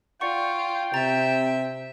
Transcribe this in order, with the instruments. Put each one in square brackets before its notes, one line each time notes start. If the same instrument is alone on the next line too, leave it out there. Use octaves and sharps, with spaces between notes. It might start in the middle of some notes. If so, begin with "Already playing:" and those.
[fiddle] F4 [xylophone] D5 F#5 C#6 [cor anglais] G5
[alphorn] C3 [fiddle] E5 [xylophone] A#5 A6